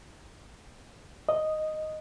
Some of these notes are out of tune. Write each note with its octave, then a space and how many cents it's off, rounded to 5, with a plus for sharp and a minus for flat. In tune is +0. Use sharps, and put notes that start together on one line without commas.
D#5 -5